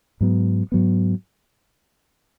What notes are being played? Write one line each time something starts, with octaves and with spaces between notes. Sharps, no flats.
G#2 F#3 B3
G#2 F#3 B3